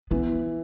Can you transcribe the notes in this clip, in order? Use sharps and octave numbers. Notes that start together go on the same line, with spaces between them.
E3 B3